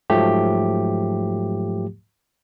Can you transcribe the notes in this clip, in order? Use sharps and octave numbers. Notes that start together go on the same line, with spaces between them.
G#2 F3 F#3 A3 G4